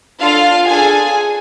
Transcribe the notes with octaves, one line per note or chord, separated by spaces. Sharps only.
D4 F4 A4 F5
D4 G#4 A4 G#5